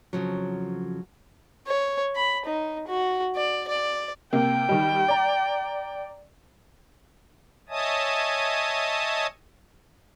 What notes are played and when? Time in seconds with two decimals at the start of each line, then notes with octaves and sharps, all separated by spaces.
0.13 F2 C#3 F3 F#3
1.67 C#5
2.16 B5
2.46 D#4
2.88 F#4
3.36 D5
3.68 D5
4.33 C3 A#3 G5
4.69 D#3 G3
5.08 D5 A#5
7.69 C#5 D#5 E5 G#5 A5 D#6